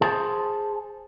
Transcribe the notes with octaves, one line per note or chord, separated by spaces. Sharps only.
G#4 C5 A5